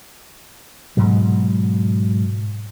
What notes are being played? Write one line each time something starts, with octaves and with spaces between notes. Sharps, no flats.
G#2 B2 F#3